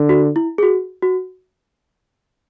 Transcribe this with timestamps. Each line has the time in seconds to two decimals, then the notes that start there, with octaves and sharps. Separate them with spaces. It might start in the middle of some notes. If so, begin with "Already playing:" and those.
Already playing: D3
0.09 F#4
0.36 E4
0.58 G#4
0.63 F#4
1.03 F#4